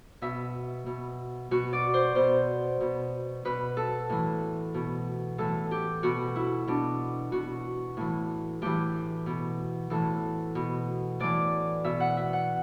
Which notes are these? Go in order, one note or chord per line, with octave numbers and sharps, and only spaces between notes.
B2 E5
B2
B2 F#4
D5
C5
B2 C5
B2
B2 B4
A4
A2 E3
B2
A2 E3 A4
G4
B2 F#4
E4
B2 D4
B2 F#4
A2 E3
A2 E3 G4
B2
A2 E3 A4
B2
A2 E3 D5
B2 E5
F#5
E5
F#5